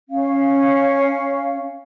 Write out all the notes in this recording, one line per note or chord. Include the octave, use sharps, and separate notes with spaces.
C#4 F5